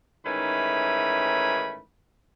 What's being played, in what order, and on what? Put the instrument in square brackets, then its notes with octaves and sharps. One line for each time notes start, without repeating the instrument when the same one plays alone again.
[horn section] G#2 D#3 E3 A3 C#4 B5